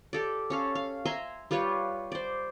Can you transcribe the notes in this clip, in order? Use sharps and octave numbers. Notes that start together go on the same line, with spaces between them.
G4 A4 D5
C#4 A4 F5
F5
E5 G#5 A#5 C6
G3 F4 B4 C#5
C5 D5